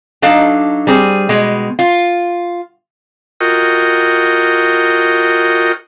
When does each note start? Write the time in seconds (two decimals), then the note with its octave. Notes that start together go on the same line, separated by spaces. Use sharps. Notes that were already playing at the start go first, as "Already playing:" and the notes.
0.22 F#3 D4 D#4 A4 F5
0.87 G3 C4 G#4
1.29 B2 G#3
1.79 F4
3.41 F4 F#4 A#4 D#5 G5 C#6